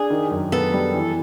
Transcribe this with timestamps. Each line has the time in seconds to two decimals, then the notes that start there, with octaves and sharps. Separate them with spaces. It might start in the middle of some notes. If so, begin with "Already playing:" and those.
Already playing: D4 G#4
0.10 D#3
0.31 F#2
0.52 B3 A4
0.73 G3
0.94 E3